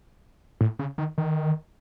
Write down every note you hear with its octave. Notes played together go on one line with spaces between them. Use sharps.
A2
C#3
D#3
D#3